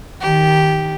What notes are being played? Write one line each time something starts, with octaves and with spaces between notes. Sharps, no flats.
D#3 G4